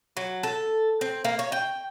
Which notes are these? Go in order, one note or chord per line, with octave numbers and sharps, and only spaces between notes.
F#3
A4
C4
A#3
C#5
G5